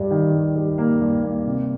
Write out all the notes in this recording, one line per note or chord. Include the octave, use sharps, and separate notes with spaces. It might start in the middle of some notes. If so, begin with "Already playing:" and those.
Already playing: G2 G3
D#3
G2
G3
A#3
G2
A#3
C3